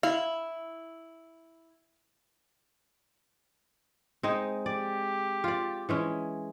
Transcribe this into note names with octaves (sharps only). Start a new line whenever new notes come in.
E4 F5
G#3 C4 D#4
G4 D5
F4 D5
E3 G#3 C#4